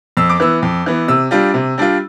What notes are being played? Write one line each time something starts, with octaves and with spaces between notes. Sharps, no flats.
F2 E6
D6
E3 B3 E6
F2
E3 B3
C3 E6
G3 D4 F4
C3
G3 D4 F4